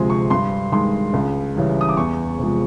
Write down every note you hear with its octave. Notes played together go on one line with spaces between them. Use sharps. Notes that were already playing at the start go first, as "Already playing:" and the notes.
Already playing: D2 C3 F3 G#3 G#5 C6
C#6
G2 C6
D#3 G#3 C6
C#2
C#3 E3 G3
D#6
D6
E2 C#6
C3 F3 G#3